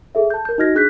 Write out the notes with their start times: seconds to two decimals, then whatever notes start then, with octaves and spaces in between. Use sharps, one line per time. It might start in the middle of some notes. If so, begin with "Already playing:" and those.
0.15 G#4 A4 E5
0.30 A5 G6
0.45 A#4 G6
0.58 D#4 F#4 D#5 F6 G#6 A#6
0.75 D4 G#4 F#6 G6 B6